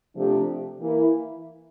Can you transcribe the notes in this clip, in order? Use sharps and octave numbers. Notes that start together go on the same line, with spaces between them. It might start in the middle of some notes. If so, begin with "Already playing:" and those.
C3 F3 A3 D4 G4
E3 A#3 E4